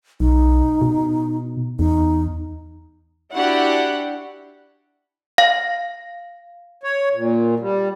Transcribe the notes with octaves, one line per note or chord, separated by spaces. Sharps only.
B1 D#4
B2
E2 D#4
D4 E4 F#4 G4 F#5
F5
C#5
A#2
G3